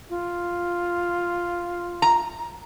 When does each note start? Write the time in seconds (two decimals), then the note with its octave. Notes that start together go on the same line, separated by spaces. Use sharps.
0.10 F4
2.02 A#5